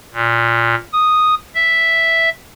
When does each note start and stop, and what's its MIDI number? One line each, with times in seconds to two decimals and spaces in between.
0.14 0.75 46
0.93 1.35 87
1.55 2.29 76